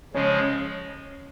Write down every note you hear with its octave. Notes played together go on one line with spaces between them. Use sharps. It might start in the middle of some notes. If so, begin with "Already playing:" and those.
C#3 F3 G#3 C#4